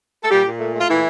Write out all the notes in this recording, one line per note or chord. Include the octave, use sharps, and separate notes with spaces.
A4
A#2 G3 G4
A#2
A3
A3
F4
A#2 E3 E4